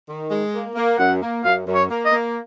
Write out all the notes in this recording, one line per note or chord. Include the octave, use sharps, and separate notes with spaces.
D#3
G#3
A#3
A#3
F#2 F#5
A#3
F#2 F5
F#2
C#5
A#3
D#5
A#3